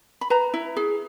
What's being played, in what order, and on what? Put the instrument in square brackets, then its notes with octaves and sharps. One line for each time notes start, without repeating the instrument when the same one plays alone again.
[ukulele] B5
B4 A#5
E4
G#4